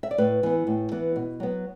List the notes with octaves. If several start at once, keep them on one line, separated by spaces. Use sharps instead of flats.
E5
D5
A2 B4
E3 B3
A2
E3 B3
B2
F#3 B3